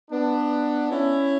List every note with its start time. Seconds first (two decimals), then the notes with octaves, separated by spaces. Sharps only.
0.11 B3 D4
0.90 C#4 E4